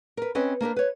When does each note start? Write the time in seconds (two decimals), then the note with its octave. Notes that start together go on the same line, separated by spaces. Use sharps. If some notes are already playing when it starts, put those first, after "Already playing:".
0.17 A#4 B4
0.35 C4 C#4 B4 D#5
0.61 A#3 D4 A#4 B4
0.76 B4 C#5